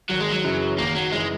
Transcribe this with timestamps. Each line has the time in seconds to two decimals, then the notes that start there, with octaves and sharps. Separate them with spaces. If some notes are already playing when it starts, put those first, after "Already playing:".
0.10 G#1 F#3
0.21 G#3
0.31 F#3
0.44 F#2 C#3 E3
0.78 G#1 A#3
0.95 F#3
1.12 F#2 C#3 E3 G#3